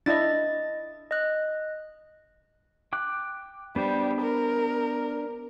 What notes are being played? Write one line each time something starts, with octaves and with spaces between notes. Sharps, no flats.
D4 E4 D#5 A6
D#5 F#6
G5 D6 F#6
G3 B3 D4 C5
A#4